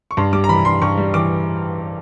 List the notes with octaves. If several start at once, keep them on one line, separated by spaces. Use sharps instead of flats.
C#6
G2 C6
G3 D6
A#5
E3 B5
G2 C6
G2 C#6
G3
E3 D6